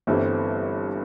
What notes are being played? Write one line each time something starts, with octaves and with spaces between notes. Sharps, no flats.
G1 G2 E3 A3 C4